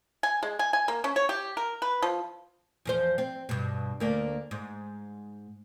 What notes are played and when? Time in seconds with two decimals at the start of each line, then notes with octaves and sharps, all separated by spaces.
0.23 G#5
0.43 G#3
0.59 G#5
0.73 G#5
0.88 A#3
1.04 C#4
1.16 C#5
1.29 G4
1.57 A#4
1.82 B4
2.02 F3
2.85 E2 F3 C5
3.18 C4
3.49 G2 B2
4.00 D2 A#3 D4
4.51 G#2